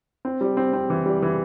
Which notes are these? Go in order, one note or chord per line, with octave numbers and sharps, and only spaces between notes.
C4
G3
C4
C4
E3
G3
E3